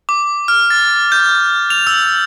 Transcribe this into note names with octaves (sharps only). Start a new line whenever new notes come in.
D6
F6
A6
G6
F7
E6